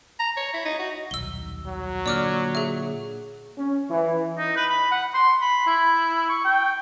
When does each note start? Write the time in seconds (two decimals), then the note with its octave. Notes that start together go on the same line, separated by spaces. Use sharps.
0.19 A#5
0.37 C#5
0.54 E4
0.65 D#4
0.79 F#4
1.11 D#1 B1 E6 G7
1.67 F#3
2.06 A#2 D3 D5 D6 F6
2.55 G#4 E5
3.58 C#4
3.90 E3
4.38 D#4
4.56 B4
4.70 B5
4.92 F#5
5.14 C6
5.41 B5
5.67 E4
6.29 C#6
6.45 G5